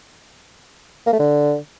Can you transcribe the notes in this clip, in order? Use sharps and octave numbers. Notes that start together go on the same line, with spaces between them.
A#3
A3
D3